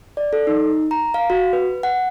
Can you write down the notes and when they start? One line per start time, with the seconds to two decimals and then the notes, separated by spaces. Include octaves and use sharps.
0.17 D5
0.33 A4
0.47 D#4
0.91 A#5
1.14 F5
1.30 F#4
1.53 B4
1.83 F#5